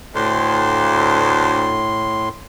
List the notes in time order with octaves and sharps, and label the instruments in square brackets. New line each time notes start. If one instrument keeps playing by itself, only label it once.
[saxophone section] D2 [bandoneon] A2 C6